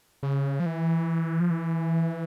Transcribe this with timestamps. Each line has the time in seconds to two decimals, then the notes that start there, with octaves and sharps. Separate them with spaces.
0.23 C#3
0.60 F3
0.66 E3
1.40 F3
1.50 E3